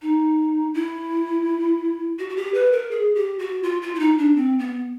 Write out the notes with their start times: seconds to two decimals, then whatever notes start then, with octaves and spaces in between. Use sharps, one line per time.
0.02 D#4
0.74 E4
2.19 F#4
2.29 F#4
2.37 G4
2.54 B4
2.72 A#4
2.91 G#4
3.15 G4
3.39 F#4
3.63 F4
3.82 F4
3.95 E4
4.00 D#4
4.18 D4
4.36 C4
4.59 B3